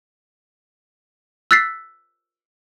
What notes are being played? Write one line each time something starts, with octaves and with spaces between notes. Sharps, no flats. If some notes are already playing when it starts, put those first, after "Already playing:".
E6 F#6 A6 B6 C7